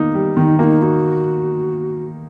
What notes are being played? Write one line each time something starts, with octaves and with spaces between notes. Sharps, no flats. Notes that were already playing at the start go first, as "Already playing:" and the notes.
Already playing: D#3 A#3 D#4
G3
D#3 D#4
A#3 D#4 F#4
D#4 F#4